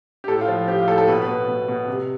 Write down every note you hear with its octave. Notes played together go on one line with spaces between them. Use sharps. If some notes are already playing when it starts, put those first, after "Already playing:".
G4
A2 A4
F4
F3
F3 G4
F4
A2 A4
A4
B2 B4
B4
B2
B2
B2
C3